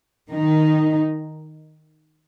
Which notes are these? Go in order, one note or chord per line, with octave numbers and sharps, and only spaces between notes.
D#3 D#4